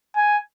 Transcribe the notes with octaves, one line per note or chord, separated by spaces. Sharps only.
G#5